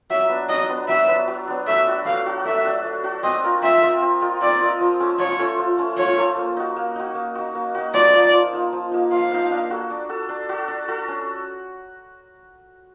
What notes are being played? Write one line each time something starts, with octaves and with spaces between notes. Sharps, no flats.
F#3 E5
B3 D4
F#3 D#5
B3 D4
F#3 E5
B3 D4
F#3
B3 D4
A3 E5
D4 F#4
A3 F5
D4 F#4
A3 E5
D4 F#4
A3
D4 F#4
C4 D#5
F4 A#4 D#5
C4 E5
F4 A#4 D#5
C4
F4 A#4 D#5
C4 D5
F4 A#4 D#5
F3
A3 C#4
F3 C#5
A3 C#4
F3
A3 C#4
F3 C#5
A3 C#4
A#3
D#4 F#4
A#3
D#4 F#4
A#3
D#4 F#4
A#3
D#4 F#4
F3 D5
A#3 D#4
F3
A#3 D#4
F3
A#3 D#4
F3 F5
A#3 D#4
D4
F#4 A4
D4
F#4 A4
D4
F#4 A4
D4
F#4 A4
C#4